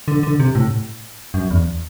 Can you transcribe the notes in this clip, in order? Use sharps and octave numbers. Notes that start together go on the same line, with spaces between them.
D3
D3
C3
A2
F#2
E2